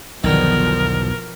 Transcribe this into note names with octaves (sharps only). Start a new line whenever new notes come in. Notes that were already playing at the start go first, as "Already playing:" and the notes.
B1 E2 B2 D3 D#3 F3 A#4